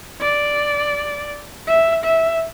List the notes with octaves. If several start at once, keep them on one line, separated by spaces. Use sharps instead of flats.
D5
E5
E5